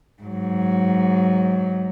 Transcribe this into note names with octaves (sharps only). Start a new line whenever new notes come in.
G#2 F#3